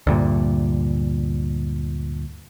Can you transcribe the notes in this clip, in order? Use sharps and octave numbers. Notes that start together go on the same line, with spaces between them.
D2 G2 A#2